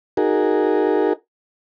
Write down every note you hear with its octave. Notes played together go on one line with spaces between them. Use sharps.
D#4 F#4 G#4 A#4